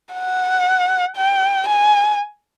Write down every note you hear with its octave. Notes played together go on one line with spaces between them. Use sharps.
F#5
G5
G#5